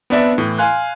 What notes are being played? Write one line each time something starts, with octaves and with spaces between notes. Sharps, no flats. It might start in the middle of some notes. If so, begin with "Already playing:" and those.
B3 C4 D4 B4 D5 E5
A2 E3
F5 G#5 C6 F#6